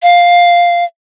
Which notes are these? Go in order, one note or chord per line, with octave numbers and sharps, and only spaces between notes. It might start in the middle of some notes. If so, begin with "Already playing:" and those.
F5